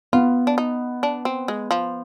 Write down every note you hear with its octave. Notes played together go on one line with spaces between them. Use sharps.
B3 F4
D4
D#4
D4
C4
G#3
F3